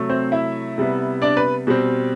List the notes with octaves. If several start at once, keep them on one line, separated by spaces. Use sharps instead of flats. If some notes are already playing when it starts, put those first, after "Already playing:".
Already playing: C3 F#3 A3
C4 C5
E4 E5
C3 G3 B3
D4 D5
B4
B2 G3 C4